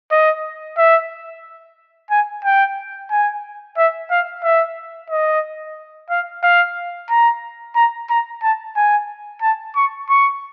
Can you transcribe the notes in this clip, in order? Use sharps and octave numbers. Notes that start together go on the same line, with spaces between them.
D#5
E5
G#5
G5
G#5
E5
F5
E5
D#5
F5
F5
A#5
A#5
A#5
A5
G#5
A5
C#6
C#6